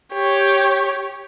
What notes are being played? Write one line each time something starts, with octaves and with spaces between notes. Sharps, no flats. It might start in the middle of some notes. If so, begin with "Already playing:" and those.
G4 C#5